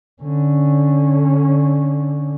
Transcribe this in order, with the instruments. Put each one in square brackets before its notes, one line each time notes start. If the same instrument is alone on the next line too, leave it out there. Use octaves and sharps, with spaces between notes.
[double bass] D3 C#4